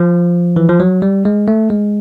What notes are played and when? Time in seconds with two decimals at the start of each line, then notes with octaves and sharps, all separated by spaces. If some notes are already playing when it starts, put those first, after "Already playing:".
Already playing: F3
0.56 E3
0.69 F3
0.80 F#3
1.02 G3
1.25 G#3
1.48 A3
1.70 G#3